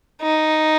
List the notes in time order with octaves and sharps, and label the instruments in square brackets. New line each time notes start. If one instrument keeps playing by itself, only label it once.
[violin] D#4